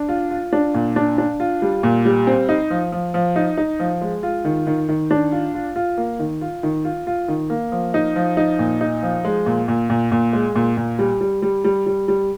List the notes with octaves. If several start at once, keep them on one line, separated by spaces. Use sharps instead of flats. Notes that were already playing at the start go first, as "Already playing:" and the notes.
Already playing: D4
F4
F4
D4
A#2
D4
D4
F4
G3
A#2
G3
C4
D#4
F3
F3
F3
D#4
D#4
F3
G#3
F4
D#3
D#3
D#3
D4
F4
F4
F4
A#3
D#3
F4
D#3
F4
F4
D#3
A#3
F3
D#4
F3
D#4
A#2
D#4
F3
G#3
A#2
A#2
A#2
A#2
G#3
A#2
A#2
G3
G3
G3
G3
G3
G3